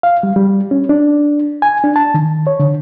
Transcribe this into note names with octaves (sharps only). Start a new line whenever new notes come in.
F5
G3
G3
C#4
D4
G#5
D4
A5
D#3
C#5
D3